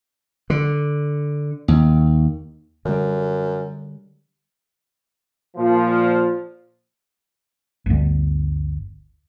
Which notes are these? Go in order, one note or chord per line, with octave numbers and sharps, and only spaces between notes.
D3
D#2
F#2 D3 G3
A#2 F3
G1 D2